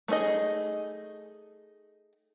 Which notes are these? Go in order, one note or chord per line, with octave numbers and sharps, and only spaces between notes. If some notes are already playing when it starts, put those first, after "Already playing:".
A3 C4 D#4 G#4 D#5